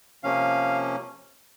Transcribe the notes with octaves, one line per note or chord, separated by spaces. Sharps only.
C3 F3 A#3 C#4 F5